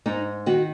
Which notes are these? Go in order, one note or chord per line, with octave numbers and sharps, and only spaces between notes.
G#2 D#4
D#3 F#4